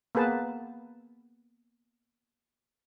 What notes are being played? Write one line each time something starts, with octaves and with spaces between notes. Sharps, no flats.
A#3 B3 G#4 B4 A5